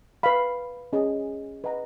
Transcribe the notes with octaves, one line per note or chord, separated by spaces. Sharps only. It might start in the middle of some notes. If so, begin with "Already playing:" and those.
B4 F5 B5
C#4 G#4 D#5
B4 D#5 F#5 A#5